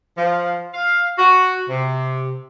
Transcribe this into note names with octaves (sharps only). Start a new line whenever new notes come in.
F3
F5
F#4
C3